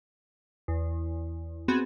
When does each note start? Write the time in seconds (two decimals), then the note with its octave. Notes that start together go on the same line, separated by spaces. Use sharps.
0.68 E2
1.68 B3 C4 F#4 G#4